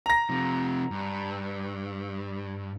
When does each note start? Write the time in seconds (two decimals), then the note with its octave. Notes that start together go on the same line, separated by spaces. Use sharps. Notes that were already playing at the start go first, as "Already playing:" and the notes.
0.06 A#5 A#6
0.30 C3 F3
0.91 G2